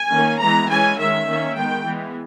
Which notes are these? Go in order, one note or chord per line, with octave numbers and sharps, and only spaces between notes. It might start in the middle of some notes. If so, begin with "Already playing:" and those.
Already playing: G#5
D#3 A#3 C#4
E3 G#3 B3 A#5
E3 G#3 C#4 G#5
D#3 G#3 C#4 E5
D#3 A#3 C#4
D#3 G#3 B3 G5
E3 G#3 B3